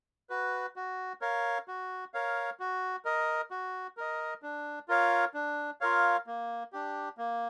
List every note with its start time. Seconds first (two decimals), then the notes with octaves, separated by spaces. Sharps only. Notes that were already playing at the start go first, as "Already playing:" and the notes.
0.30 F#4 B4
0.76 F#4
1.21 A#4 C#5 F5
1.68 F#4
2.14 A#4 C#5 F5
2.60 F#4
3.05 A#4 D#5
3.51 F#4
3.97 A#4 D#5
4.43 D4
4.88 F4 A#4 C#5 F5
5.34 D4
5.81 F4 A#4 C#5 F5
6.27 A#3
6.73 D4 G4
7.17 A#3